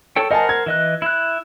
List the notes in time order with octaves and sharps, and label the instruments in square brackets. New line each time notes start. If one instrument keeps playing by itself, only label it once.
[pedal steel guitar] A4 C#5 G5
[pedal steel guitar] A#4 C5 F#5 [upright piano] D#5 G#5 A5
[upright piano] G#6
[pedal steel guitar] E3 D#5 F#6
E4 F#6